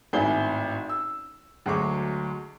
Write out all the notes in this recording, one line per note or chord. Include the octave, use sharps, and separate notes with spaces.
G#1 A2 C4 E4 G#5 G7
E6
D2 F#3 G#3 C#6 D6